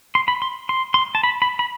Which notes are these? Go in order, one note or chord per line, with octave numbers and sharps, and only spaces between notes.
C6
B5
C6
C6
C6
A5
B5
B5
B5